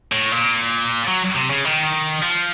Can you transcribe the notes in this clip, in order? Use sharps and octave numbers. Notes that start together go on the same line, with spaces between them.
A2
A#2
F#3
C3
C#3
D#3
F3